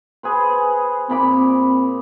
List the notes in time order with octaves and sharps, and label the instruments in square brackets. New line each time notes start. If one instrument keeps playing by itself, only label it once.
[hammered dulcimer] G#4 B4 C5
[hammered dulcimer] A#2 B5 D6 [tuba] C4